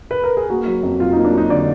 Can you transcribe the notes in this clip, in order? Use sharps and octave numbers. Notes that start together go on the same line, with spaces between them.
B4
A#4
G#4
A#3 F#4
F#3
F2
F#3 F4
A#3 D#4
D4
F#3 D#4
D3 D5